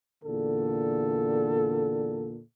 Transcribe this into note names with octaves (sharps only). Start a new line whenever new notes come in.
E2 A#2 D3 A4